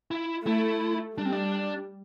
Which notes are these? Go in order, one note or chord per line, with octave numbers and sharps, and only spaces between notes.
E4
A3 E4
G3 D4
C4
D4